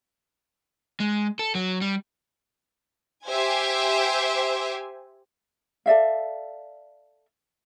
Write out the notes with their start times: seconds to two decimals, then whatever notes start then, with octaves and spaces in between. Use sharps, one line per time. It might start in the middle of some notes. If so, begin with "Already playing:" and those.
1.00 G#3
1.39 A4
1.55 F#3
1.81 G3
3.26 G4 C5 E5 G#5
5.86 A4 D5 E5 F5